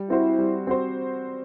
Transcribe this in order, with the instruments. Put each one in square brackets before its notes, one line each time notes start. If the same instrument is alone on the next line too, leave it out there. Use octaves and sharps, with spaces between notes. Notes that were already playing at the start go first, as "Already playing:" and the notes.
Already playing: [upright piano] G3
[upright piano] C4 F#4 C5 [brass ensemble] E4
[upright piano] G3
C4 F#4 C5